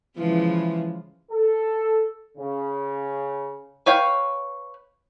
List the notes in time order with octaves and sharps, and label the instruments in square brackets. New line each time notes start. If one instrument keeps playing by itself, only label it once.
[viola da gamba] C#3 F3 G#3 [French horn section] E3
[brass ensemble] A4
C#3
[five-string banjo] B4 C#5 F5 G5